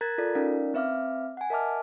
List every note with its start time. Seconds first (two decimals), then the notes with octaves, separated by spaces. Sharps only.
0.01 A#4 A#5 F#6 G#6 A6
0.18 F4 A4 D5
0.35 C#4 D#4 A#4 D5 F5
0.74 C4 B4 E5 F5 D6 F6
1.37 F#5 G#5
1.50 A#4 D#5 E5 A5 D6 F6